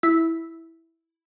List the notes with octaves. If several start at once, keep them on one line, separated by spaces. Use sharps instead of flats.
E4